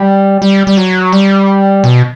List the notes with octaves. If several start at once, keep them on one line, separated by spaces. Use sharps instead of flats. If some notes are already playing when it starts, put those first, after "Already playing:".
Already playing: G3
G3
G3
F#3
G3
B2